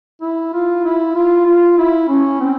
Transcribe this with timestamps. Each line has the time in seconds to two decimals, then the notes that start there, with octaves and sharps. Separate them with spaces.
0.21 E4
0.53 F4
0.85 E4
1.16 F4
1.46 F4
1.78 E4
2.08 C#4
2.40 C4